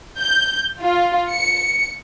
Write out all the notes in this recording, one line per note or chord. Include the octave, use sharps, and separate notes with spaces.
G6
F4
C#7